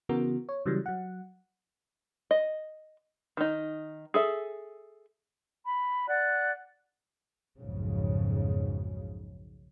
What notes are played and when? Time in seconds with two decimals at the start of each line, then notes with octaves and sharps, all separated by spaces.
0.09 C#3 E3 B3 F#4 A#4
0.49 C#5
0.66 C#3 E3 F#3 G3
0.86 F#3 F#5
2.31 D#5
3.37 D#3 D#4
4.14 G#4 A4 E5
5.66 B5
6.08 D5 F#5 F#6
7.59 B1 F2 G#2 C#3